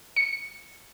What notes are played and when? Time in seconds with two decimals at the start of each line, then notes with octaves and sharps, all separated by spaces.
0.16 C#7